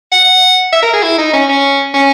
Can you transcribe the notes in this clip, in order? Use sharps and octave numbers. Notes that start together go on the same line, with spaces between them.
F#5
E5
A#4
G#4
E4
D#4
C#4
C#4
C#4